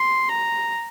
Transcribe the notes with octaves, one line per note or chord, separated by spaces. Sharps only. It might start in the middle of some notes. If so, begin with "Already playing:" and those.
Already playing: C6
A#5